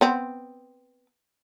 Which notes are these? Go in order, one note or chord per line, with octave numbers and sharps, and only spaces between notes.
B3 C4